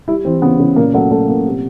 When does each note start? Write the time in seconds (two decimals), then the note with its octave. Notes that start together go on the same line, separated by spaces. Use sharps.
0.08 G3 E4
0.25 E3 C4
0.42 C#3 B3
0.60 C#3
0.76 A#2 A#3
0.94 F#3 A3
1.11 F#3 A3
1.28 A#2 A#3
1.46 C3